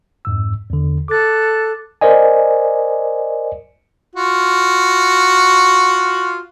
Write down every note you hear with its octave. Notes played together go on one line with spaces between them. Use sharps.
F2 G#2 E6
E2 D3
A4 D6 F#6 A6
A#4 C5 D5 D#5 G#5
F4 F#4